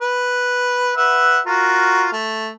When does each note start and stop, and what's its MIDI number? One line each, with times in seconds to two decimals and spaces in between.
0.02 0.95 71
0.97 1.39 71
0.97 1.39 76
0.97 1.39 78
1.46 2.08 65
1.46 2.08 66
1.46 2.08 70
2.12 2.49 57